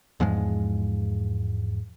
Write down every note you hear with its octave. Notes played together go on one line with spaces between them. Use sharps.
E2 G#2 F3 G#3